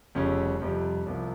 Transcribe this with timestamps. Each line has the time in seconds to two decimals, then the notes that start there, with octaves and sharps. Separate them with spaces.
0.15 F1 F2 C#3 G3 C#4
0.61 F2 C3 G3
1.06 C2 C3 F3